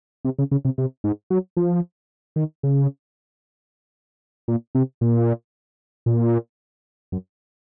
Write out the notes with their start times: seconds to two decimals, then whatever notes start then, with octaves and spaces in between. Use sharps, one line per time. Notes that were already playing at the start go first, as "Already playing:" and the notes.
0.25 C3
0.39 C#3
0.51 C#3
0.65 C3
0.78 C3
1.04 G#2
1.30 F#3
1.57 F3
2.36 D#3
2.63 C#3
4.48 A#2
4.75 C3
5.01 A#2
6.06 A#2
7.12 F#2